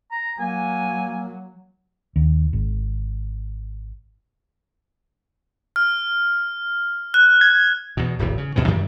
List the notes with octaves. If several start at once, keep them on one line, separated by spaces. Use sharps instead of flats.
A#5
F#3 A#3 G#5
D#2
G#1
F6
F#6
G#6
E2 B2
D1 G#1 E2 C3
C#3
D#2 B2 D#3 E3
F#2 D#3 E3 G3